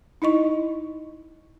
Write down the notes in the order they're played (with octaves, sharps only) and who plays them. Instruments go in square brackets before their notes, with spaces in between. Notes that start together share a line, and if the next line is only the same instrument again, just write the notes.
[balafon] D#4 E4 D#5 C#6